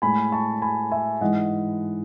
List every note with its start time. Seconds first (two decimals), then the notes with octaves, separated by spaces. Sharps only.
0.02 A2 G#3 G#5 B5
0.32 A5 C#6
0.62 G#5 B5
0.91 E5 G#5
1.21 G#2 E3 G#3 D#5 F#5